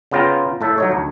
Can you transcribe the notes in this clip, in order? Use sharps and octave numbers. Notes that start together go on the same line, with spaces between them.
C#3 B3 F4 G5 A#5
A2 A4 E5
F#3 D#4 C#5
D2